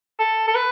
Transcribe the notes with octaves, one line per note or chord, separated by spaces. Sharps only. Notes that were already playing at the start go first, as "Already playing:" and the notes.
A4
A4
B4